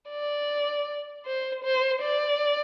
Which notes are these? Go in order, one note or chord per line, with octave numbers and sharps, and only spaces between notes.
D5
C5
C5
D5